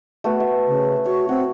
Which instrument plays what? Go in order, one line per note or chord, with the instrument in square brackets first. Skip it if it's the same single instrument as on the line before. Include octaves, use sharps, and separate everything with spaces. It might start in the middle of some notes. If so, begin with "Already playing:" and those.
[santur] A3 B3 F#4
E5
[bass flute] C#3
[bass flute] F#4 [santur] C#5
[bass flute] C4 [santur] F#4